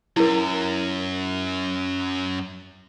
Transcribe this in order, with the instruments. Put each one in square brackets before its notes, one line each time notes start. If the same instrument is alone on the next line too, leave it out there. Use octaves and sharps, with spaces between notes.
[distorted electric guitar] F#2 [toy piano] E4 A#4